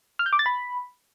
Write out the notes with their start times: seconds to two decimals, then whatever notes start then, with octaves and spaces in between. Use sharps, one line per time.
0.19 F6
0.26 G6
0.33 D6
0.39 A6
0.46 B5